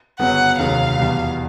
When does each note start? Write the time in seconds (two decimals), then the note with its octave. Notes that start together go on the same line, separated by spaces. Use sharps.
0.19 G1 F#2 C#3 F#3 B3 F#5
0.59 F1 D#2 C#3 F#3 F5
0.98 E2 B2 G3